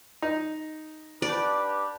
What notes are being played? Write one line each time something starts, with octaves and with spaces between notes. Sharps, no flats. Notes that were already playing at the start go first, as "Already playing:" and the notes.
D#4
D4 G4 B4 D5